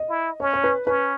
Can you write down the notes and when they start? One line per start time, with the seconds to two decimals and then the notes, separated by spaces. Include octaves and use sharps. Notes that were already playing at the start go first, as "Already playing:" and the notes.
Already playing: D#5
0.09 E4
0.40 C#4 C#5
0.54 C#5
0.64 B4
0.86 C#4 B4